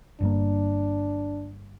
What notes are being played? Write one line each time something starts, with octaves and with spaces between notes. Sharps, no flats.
G1 G2 A#3 D4